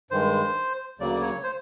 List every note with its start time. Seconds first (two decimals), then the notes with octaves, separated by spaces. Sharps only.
0.11 G2 D#3 G#3 C5
0.99 D2 C#3 F#3 A#3 D5
1.22 C#5
1.44 C5